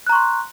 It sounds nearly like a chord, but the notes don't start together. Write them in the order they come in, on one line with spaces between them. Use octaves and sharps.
F#6 A#5 C#6 C6